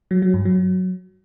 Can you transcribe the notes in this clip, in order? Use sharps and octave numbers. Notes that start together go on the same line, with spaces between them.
F#3
F#3
G2
F#3